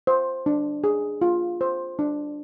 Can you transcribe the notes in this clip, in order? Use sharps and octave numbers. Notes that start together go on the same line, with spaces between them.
C5
D4
G#4
F4
C5
D4